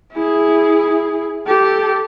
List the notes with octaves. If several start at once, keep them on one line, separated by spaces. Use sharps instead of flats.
E4 G#4
G4 A4